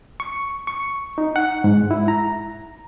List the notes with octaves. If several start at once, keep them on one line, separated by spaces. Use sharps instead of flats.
C#6
C#6
D#4
F#5
G#2
E4
A#5